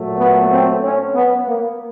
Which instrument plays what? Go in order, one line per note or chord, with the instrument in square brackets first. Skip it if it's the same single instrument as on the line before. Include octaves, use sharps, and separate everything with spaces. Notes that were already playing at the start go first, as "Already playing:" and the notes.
Already playing: [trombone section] A#2 F#3 A3
B3
C4
C#4
B3
A#3